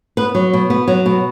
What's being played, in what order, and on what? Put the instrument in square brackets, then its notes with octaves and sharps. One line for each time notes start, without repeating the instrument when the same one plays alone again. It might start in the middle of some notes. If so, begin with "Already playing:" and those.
[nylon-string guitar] B3 B4
F#3
B2
B3
F#3
B2